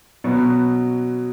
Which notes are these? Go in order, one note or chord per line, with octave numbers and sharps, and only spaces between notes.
B2 F#3 B3